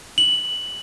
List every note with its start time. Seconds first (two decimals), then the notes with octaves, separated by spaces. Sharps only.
0.18 F#7